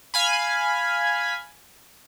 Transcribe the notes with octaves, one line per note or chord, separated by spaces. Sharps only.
F5 G#5 B5